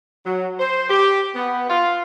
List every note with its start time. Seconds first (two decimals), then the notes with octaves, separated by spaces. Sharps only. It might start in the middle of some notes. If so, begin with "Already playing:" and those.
0.25 F#3
0.59 C5
0.89 G4
1.35 B3
1.69 F4